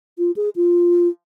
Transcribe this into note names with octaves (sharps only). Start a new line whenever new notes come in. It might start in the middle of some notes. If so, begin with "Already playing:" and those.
F4
G#4
F4